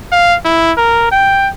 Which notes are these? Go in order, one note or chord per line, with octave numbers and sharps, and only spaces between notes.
F5
E4
A#4
G5